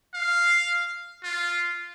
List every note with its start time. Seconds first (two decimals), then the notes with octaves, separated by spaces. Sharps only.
0.14 F5
1.24 F4